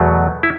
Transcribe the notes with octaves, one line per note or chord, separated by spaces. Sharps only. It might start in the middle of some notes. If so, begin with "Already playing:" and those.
Already playing: E2 B2 F#3 A3
E4